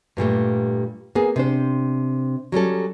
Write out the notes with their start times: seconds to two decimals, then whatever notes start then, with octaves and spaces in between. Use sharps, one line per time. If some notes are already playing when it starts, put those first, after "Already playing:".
0.17 G2 A#2 G3 A3
1.15 A#3 B3 G#4
1.36 C3 D4 C5
2.52 F#3 G3 C#4 A4